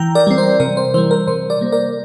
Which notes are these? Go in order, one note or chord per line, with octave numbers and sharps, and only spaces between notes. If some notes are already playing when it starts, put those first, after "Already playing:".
Already playing: E3 G5 A#5
A#4 D5
G3 C4
C5
C3 A#4
C5
E3 G3 C5
A#4
C3 C5
A#4 D5
G3 A#3
A#4 D5